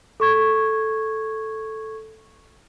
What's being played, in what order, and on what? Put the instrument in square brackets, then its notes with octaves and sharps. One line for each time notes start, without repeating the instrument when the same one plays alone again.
[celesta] A4 C#6 G#6